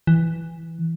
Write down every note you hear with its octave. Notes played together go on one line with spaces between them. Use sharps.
E3